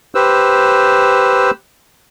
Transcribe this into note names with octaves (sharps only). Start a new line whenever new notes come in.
G4 B4 C5 E6